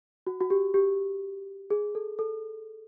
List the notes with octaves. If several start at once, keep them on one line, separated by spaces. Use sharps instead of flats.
F#4
F#4
G4
G4
G#4
A4
A4